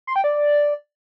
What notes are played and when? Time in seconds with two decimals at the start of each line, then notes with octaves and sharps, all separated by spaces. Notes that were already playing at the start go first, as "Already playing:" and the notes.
0.07 C6
0.16 G5
0.24 D5